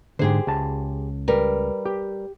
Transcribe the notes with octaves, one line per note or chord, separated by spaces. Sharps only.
G#2 D3 G4 G#4 C5
C#2 A5
G3 A#4 B4
G4